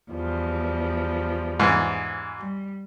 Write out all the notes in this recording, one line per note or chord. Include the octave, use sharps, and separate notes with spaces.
E2 F3 G3
G#2 E3
G3